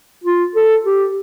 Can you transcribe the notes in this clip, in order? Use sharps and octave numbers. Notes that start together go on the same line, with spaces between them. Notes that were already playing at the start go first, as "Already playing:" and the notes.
F4
A4
G4